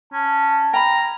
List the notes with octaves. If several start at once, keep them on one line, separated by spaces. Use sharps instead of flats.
C#4 A5
G5 A#5 B5